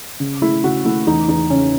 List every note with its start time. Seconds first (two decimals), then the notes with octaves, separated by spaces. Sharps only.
0.20 C#3
0.42 A3 E4
0.63 C#3 F#4
0.85 A3 E4
1.07 E2 D#4
1.28 E2 D#4
1.50 C#3 C#4